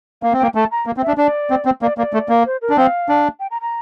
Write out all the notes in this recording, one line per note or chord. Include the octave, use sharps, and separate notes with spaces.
A#3 F5
C4
A#3 G5
A3 A5
A#5
A#3
C4
E5
D4
D4 D5
C4
C4
A#3 D5
A#3 D5
A3
A#3
C5
A#4
D4
C4 F5
D4
G5
A#5
A#5